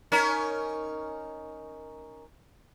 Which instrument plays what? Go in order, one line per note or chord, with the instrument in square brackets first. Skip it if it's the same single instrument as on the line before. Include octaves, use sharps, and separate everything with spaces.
[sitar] C#4 D#4 A#4